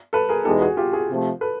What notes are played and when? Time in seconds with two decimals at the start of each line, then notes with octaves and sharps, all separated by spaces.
0.13 A4 B4
0.29 G#4 A#4
0.45 E2 B2 G#3 B3 D#4 G4 A4
0.61 F#4 G#4
0.77 F4 G4
0.93 F#4 G#4
1.09 C3 F3 A3
1.41 A4 B4